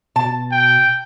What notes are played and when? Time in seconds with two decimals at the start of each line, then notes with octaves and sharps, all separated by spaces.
0.16 B2 A5
0.52 G5